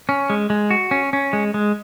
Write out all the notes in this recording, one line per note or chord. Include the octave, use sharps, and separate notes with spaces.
C#4
G#3
G#3
F#4
C#4
C#4
G#3
G#3